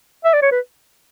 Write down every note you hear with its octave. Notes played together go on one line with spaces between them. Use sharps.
E5
D5
C#5
B4